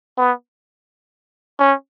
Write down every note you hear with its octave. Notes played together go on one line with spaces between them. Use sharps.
B3
C#4